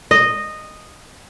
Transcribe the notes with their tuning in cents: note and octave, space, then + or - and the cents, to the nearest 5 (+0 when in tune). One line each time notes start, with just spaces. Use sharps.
D#5 -10